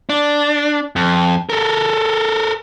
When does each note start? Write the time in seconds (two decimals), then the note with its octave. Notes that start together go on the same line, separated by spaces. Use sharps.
0.09 D4
0.96 F2
1.50 A4 A#4